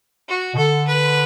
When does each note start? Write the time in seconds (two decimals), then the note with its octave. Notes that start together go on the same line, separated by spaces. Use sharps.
0.28 F#4
0.53 B2
0.57 D3 A4
0.87 B4